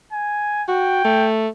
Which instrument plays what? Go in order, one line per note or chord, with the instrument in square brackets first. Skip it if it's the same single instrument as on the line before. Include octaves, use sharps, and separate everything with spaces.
[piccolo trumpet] G#5
[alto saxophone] F#4 [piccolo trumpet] G5
[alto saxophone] A3